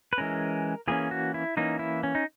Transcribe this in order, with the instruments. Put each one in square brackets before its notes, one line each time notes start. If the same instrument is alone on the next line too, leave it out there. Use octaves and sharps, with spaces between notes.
[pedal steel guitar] B4
E3 G#3 C#4 A#4
E3 A#3 C#4 G#4
F#4
E4
E3 A#3 C#4 D#4
E4
C#4
D#4